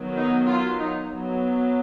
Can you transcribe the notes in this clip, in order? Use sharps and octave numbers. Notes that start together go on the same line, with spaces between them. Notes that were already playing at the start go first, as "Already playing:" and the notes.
Already playing: D#3 F#3 B3
D#4
F4
D#4
F#3 B3